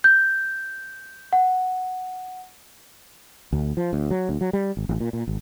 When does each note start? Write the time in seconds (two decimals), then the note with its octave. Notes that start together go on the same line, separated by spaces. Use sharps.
0.04 G6
1.33 F#5
3.53 D2
3.77 F3
3.93 D2
4.11 F#3
4.29 D2
4.41 F#3
4.53 G3
4.77 G#1
4.89 A1
5.00 A#2
5.13 A#2
5.28 G#1